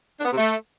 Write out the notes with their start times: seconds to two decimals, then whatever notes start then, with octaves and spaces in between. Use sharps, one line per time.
0.18 D4
0.25 B3
0.31 C3
0.37 A3